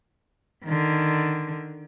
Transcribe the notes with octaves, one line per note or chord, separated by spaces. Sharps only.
D3 D#3